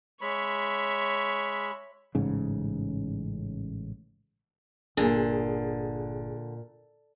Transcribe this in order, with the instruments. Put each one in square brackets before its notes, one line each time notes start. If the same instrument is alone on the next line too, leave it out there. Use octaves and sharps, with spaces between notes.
[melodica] G#3 B5 [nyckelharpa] C#5 E5
[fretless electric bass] A1 G#2 C#3
[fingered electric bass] G1 [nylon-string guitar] A#2 [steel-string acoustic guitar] D3 [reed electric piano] G#4